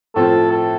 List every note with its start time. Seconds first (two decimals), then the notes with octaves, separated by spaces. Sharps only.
0.15 A2 F3 A3 C4 F4 A4
0.52 A4